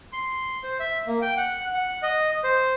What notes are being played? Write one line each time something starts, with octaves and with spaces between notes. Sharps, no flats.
C6
C5
E5
A#3
G5
F#5
F#5
D#5
C5